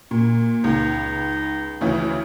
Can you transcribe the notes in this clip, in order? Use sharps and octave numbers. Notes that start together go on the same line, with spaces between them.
A#2
C#2 D#4
D2 C#3 E3